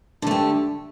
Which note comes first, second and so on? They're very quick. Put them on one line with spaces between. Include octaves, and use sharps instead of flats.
D3 A3 G4